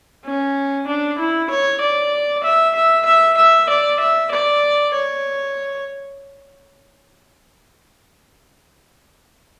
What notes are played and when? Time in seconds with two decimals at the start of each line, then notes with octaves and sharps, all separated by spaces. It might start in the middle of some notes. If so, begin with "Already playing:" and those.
0.25 C#4
0.87 D4
1.18 E4
1.50 C#5
1.80 D5
2.44 E5
2.75 E5
3.06 E5
3.37 E5
3.69 D5
4.00 E5
4.31 D5
4.93 C#5